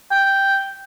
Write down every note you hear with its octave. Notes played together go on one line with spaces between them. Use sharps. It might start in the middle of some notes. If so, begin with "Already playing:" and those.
G5